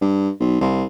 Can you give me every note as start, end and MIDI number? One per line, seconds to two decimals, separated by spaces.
0.01 0.30 43
0.40 0.60 35
0.61 0.85 36